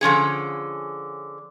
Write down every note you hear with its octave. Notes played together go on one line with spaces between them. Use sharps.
D3 F3 C#4 G#4